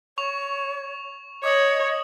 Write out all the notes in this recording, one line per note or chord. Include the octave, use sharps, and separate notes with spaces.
C#5 C#6 F7
C#5 D#5 D6 D#6 F#7